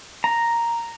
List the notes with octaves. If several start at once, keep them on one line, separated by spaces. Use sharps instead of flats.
A#5